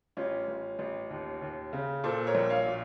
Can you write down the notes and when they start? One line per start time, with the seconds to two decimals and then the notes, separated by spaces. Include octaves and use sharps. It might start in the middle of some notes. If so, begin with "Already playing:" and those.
0.17 A1 C#4 F4
0.48 A1
0.79 A1
1.10 D#2
1.42 D#2
1.73 C#3
2.04 A#2 A4 C5
2.27 A#4 C#5
2.35 A#1
2.50 C#5 F5
2.66 A#2